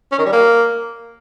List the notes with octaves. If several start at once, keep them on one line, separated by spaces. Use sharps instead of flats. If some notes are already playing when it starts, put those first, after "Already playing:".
C#4
D#3
G3
A#3